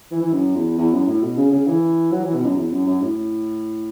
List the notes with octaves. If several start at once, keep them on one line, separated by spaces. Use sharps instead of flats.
E3
E3
F#2
E2
E2
F#2
A2
B2
C#3
C#3
E3
F#3
E3
B2
F#2
E2
F#2
F#2
A2